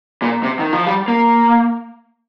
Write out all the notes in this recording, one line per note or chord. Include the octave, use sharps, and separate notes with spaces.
A#2
C3
D#3
F3
G3
A#3